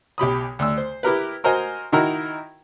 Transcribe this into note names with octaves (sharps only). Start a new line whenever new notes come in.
B1 G4 B5 D#6
D2 E6
C5
E4 G4 A#4 B4
F#4 A#4 C5 D#5 G#5
D#3 D#4 E4 F#4 A#4